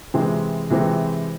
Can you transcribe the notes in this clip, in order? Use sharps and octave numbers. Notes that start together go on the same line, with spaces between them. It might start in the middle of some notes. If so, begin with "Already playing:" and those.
C3 E3 G#3 C4
C3 E3 G#3 C4